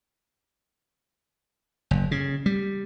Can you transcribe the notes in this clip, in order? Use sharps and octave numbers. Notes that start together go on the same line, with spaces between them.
F#1
C#3
G3